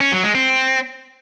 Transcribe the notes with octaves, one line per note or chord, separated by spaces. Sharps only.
C#4
F#3
G#3
C4